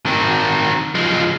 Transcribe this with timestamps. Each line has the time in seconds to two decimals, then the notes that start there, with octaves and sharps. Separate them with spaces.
0.06 D#3 C4
0.95 F3 G#3